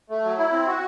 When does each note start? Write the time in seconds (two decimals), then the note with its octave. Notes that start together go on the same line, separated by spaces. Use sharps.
0.10 A3
0.24 F#3
0.38 E4
0.52 C4
0.67 F#4